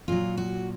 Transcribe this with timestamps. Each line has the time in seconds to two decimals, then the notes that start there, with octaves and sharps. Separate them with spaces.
0.08 A#2 F#3 F4
0.37 F#4